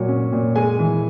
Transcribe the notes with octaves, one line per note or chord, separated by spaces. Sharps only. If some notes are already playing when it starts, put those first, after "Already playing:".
Already playing: A#2 F#3
C#4
A#2
G#3 G#5
E3